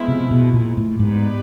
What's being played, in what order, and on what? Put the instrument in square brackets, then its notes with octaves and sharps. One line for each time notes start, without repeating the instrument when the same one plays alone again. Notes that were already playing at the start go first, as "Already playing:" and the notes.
Already playing: [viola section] F3 G#3 B3 E4
[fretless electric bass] C3
B2
A#2
A2
[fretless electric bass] G#2 [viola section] B3 D#4 G4 B4 D5